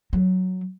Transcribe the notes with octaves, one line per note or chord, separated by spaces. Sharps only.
F#3